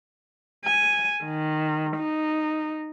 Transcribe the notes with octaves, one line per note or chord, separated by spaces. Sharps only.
G#5
D#3
D#4